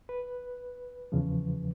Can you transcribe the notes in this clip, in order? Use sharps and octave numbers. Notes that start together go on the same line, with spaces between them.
B4
E2 C#3 F3